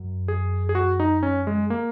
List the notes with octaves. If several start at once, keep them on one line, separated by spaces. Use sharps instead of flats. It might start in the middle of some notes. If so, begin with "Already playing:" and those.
Already playing: F#2
G#4
G#4
F#4
D#4
C#4
G#3
A#3